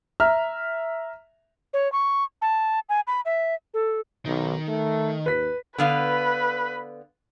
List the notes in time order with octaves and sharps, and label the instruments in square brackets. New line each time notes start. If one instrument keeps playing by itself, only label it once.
[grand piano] E5 A#5 F6
[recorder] C#5
C#6
A5
G#5
B5
E5
A4
[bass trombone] B1 [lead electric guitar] D#3
[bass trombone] A3
[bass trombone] D#2 [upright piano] B4 B6
[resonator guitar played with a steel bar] D3 B3 F5 [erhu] B4